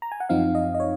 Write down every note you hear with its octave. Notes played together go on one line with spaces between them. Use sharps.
A#5
G#5
F#5
F#2 F3 C4 D#4 F5
D#5
D#5
C#5